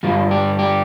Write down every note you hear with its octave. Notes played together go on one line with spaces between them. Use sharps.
G2 D3 G3 F4
G4
G4